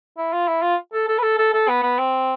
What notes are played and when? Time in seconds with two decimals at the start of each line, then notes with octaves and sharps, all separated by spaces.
0.18 E4
0.33 F4
0.48 E4
0.62 F4
0.94 A4
1.08 A4
1.19 B4
1.23 A4
1.39 A4
1.54 A4
1.69 B3
1.83 B3
1.99 C4